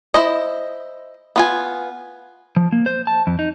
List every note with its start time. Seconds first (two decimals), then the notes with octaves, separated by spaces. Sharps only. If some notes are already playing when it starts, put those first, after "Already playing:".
0.14 E4 C5 D#5
1.36 B3 F4 G#5
2.56 F3
2.72 A#3
2.86 C5
3.07 A5
3.27 F2
3.39 D#4